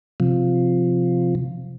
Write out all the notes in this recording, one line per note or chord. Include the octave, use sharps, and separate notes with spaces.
C3 F3